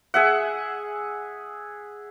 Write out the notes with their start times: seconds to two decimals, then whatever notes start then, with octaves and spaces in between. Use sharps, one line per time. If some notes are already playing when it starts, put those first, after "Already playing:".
0.14 G#4 E5 F#5